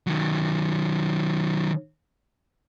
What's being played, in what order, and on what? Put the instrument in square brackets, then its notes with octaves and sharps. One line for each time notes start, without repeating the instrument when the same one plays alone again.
[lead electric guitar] D#3 F#3